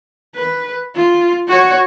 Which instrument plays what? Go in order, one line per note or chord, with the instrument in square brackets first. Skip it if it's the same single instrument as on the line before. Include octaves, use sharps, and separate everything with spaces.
[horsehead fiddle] B4
F4
F#4 C#5